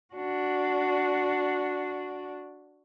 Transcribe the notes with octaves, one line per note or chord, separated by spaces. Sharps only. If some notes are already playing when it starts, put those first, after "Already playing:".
D4 F#4